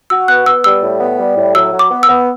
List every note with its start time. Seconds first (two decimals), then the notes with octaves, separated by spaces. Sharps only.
0.10 F#4 E6
0.28 B3 F#6
0.46 B3 E6
0.64 G3 E6
0.82 A2
1.00 B3
1.19 G3
1.37 A2
1.55 F#3 E6
1.73 F#3
1.79 D6
1.91 B3
2.03 E6
2.09 B3